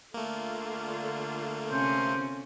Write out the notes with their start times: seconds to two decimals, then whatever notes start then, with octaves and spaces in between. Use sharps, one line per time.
0.14 D3 A3 A#3 F4
1.71 C3 C4 C#4 C5